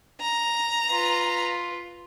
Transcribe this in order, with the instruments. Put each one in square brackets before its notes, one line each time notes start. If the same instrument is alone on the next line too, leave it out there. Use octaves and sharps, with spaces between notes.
[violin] A#5
[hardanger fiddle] F4 B4